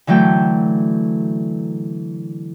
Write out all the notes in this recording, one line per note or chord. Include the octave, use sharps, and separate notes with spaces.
D3 E3 F#3 A3 G5